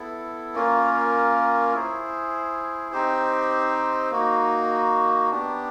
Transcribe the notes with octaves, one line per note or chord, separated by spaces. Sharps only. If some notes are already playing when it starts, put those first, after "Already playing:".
Already playing: B3 E4 A4
A#3 C#4 F4 A#4
E4 G#4 C5
C4 D#4 G4 C5
A#3 D#4 F#4
B3 D4 G4